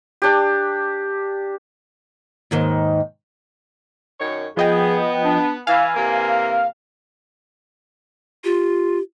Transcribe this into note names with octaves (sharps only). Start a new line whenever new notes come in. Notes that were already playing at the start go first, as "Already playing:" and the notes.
D4 G4
D#2 G#2 D#3
F#2 D#3 C#5
F3 B3 G#4 D#5 G5
D4
E3 F5 G#5
C3 E3 A#3
F4 G4